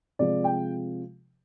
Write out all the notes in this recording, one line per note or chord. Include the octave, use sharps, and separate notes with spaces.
C3 F3 G#3 D5
G5